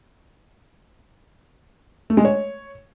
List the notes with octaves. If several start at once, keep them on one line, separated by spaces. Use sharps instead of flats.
A3
G#3
C#5